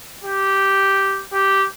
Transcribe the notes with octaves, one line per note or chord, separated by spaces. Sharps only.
G4
G4